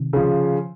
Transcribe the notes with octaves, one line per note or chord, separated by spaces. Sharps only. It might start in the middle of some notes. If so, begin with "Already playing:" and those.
Already playing: C3 D#3
C#3 F3